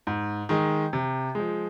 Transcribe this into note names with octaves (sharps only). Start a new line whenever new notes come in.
G#2
D#3 G#3
C3
F3 G#3